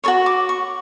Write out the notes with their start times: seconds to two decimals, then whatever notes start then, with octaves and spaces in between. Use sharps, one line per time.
0.04 F#4 A4 C#5 C#6
0.26 D6
0.49 C#6